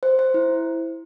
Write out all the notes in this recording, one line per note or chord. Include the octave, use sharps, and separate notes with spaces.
C5
C5
E4